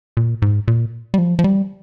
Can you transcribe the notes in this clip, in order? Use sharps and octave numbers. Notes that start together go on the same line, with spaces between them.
A#2
G#2
A#2
G3
F3
F3
G3